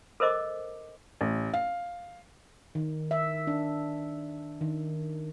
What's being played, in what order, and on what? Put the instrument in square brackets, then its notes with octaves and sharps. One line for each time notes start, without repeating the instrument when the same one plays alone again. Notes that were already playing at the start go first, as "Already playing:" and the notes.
[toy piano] A4 A#4 C5 D#5 D6
[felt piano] A1
F5
[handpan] D#3
E5
D4
D#3